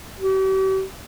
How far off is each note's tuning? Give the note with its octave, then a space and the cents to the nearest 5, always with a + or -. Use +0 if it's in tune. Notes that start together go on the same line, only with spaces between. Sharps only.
G4 -40